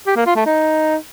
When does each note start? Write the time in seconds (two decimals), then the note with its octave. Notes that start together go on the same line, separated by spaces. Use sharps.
0.07 G4
0.16 A#3
0.26 F4
0.36 A3
0.46 D#4